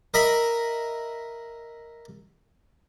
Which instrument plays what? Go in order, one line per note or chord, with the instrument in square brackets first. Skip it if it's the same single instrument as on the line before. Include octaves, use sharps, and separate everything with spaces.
[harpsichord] A#4 D#5 E5 A#5 B5